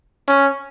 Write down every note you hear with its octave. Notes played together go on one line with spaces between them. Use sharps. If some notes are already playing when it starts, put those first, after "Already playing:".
C#4